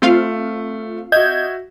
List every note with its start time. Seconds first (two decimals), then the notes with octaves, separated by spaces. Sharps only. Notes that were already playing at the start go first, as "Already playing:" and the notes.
0.02 A3 C4 F4 F5
1.12 F#4 D#5 E5 G6 G#6